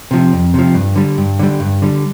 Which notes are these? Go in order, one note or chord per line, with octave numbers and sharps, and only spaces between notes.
C3 F3
F2
C3 F3
G2
D3 G3
G2
D3 G3
G2
D3 G3